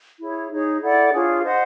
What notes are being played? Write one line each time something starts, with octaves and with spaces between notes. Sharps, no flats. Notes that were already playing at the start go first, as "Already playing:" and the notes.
E4 G#4 C#5
D#4 G#4 C#5
E4 A4 D5 F#5
D4 F4 G#4 C#5
C5 D#5 F#5